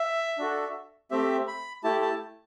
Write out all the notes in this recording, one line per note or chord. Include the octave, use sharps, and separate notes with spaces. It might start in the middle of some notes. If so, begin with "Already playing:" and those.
Already playing: E5
D4 F#4 A4
A3 C4 G4 E5
B5
A3 E4 G4 A5
A5